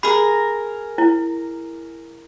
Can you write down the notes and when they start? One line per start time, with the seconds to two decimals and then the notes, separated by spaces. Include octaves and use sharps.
0.03 G#4 A#4 B5
0.98 E4